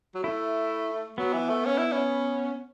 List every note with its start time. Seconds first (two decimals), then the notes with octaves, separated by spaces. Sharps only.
0.14 F#3
0.23 A3 E4
1.18 F#3 B3
1.33 E3
1.49 A3
1.65 C#4
1.78 E4
1.92 C#4